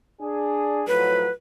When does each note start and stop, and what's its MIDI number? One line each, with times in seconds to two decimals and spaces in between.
0.21 0.82 62
0.21 0.82 68
0.87 1.27 45
0.87 1.27 53
0.87 1.27 54
0.87 1.30 71